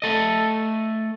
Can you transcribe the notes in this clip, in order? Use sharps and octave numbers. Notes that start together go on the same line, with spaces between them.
A3 A4 D#5